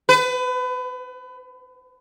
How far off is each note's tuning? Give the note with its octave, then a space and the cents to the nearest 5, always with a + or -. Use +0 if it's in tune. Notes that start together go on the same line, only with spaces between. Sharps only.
B4 +30